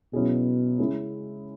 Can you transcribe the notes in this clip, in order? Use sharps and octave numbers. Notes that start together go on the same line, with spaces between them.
B2 F#3 C#4 E4 G#4
C#3 G#3 C#4 E4